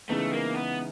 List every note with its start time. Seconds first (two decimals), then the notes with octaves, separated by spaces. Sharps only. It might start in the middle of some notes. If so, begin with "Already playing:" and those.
0.09 C#3 E3 G#3 A3 B3 D#4
0.33 A#3
0.54 B3